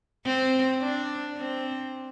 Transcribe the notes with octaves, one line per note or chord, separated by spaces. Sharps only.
C4
D4
C4